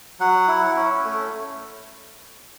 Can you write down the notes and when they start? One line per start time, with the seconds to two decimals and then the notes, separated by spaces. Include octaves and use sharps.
0.20 F#3 F#5
0.48 E4
0.76 C#4
1.04 A3